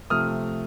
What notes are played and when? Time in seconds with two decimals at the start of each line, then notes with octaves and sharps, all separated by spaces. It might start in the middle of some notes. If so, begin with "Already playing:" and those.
0.10 C3 F3 A3 D#6 F6